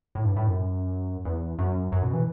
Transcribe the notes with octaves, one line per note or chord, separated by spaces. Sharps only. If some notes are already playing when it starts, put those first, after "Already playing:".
A2
G2
A2
F#2
E2
F#2
F#2
B2
E3